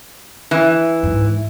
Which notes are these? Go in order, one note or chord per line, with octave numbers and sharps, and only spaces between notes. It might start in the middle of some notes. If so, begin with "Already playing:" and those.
E3
G#2